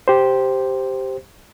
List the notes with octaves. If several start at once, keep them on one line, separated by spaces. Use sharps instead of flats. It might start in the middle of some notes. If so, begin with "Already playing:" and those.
G4 C5